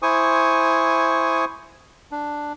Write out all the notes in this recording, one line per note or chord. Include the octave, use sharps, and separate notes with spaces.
E4 C5 G#5 C#6 D#6
D4